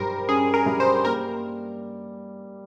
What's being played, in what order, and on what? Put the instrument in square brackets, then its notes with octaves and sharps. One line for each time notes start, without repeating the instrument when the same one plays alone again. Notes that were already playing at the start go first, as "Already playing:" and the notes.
Already playing: [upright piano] G2 G3 [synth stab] A#4 C5
[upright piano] C#4 [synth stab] G#4
[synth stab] A#4
[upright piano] G3
[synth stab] C5
[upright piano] A#3 [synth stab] A#4